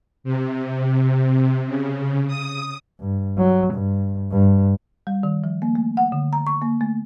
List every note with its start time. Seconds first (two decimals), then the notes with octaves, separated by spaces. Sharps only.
0.24 C3
1.66 C#3
2.27 D#6
3.00 G2
3.37 F#3
3.74 G2
4.31 G2
5.07 G3
5.23 D#3
5.44 F3
5.62 A#3
5.75 A3
5.97 F#5
6.12 D3
6.33 A#5
6.47 C#6
6.62 A#3
6.81 A3